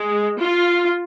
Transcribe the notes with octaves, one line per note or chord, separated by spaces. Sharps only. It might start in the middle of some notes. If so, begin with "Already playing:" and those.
Already playing: G#3
F4